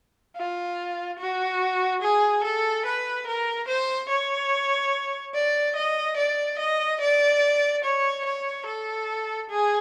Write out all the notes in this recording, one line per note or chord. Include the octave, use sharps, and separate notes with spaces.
F4
F#4
G#4
A4
B4
A#4
C5
C#5
D5
D#5
D5
D#5
D5
C#5
C#5
A4
G#4